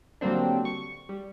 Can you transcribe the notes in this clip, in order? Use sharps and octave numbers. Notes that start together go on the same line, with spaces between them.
D3 F#3 G3 A#3 C4 D4
C#6
G3